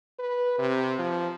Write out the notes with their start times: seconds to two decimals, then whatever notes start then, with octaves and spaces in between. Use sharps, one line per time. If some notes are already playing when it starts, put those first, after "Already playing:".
0.19 B4
0.58 C3
0.99 F3